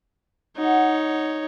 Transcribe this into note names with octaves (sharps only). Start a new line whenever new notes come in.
D#4 F#4 C#5 F#5